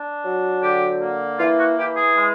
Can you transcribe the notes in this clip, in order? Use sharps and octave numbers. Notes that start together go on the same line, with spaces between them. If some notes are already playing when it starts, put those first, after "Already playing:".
Already playing: D4
F#3
D3 G4
A#3
E3 F4
F#4
E3 G4
G#4
G#3